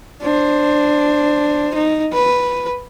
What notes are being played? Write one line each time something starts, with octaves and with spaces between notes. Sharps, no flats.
D4 C5
D#4
B4